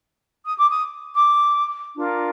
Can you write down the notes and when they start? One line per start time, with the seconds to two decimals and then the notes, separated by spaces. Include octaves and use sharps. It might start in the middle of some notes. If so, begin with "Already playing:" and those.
0.44 D#6
0.57 D6
0.68 D#6
1.15 D6
1.96 D4 F4 A#4